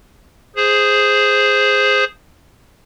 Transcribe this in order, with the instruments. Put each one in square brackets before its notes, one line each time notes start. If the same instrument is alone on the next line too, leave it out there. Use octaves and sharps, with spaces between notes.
[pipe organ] G#4 C5